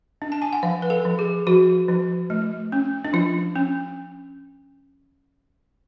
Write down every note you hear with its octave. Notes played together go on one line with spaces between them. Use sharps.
D4
A5
G#5
F#5
F3 F5
B4
A4
F3
G#4
F3 F#4
F3
A3
C#4
D4
F3 F4
C#4